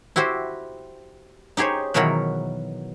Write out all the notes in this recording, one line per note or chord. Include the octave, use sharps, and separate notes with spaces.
E4 F#4 G4 C5
D#4 G4 G#4 C5 C#5
B2 D#3 E3 F#3 A#4 F#5